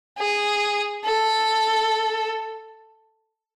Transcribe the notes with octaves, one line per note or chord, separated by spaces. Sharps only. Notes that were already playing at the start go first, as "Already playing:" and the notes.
G#4
A4